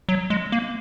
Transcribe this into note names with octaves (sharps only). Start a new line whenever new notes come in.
F#3
G#3
A#3